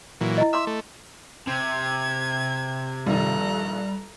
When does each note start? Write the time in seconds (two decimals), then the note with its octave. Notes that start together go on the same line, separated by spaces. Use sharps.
0.21 A#2 E3 F#3
0.38 E4 D#5
0.53 E5 C6 D6 D#6
0.67 A3
1.47 C3 G#6
3.06 A#1 G2 D#3 G3 A4 A#5 F#6